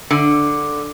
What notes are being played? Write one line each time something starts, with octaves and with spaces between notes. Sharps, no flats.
D3